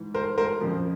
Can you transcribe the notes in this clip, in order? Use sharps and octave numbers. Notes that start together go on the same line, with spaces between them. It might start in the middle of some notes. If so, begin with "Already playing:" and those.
Already playing: G#2 E3
A#4 C5
A#4 C5
F2 C#3 F3